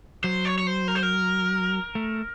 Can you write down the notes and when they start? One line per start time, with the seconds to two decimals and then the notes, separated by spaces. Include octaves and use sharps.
0.24 F#3 C5
0.45 C#5
0.58 C#5
0.67 C5
0.88 A#4
0.95 C5
1.03 A#4
1.95 A3